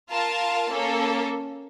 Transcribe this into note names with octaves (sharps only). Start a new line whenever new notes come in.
F4 A#4 F5 A5
A#3 C#4 A4